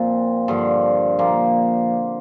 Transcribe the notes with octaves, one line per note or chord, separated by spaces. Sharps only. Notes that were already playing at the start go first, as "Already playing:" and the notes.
Already playing: A#2 F3 C4
G2 D3 F3
A#2 F3 A#3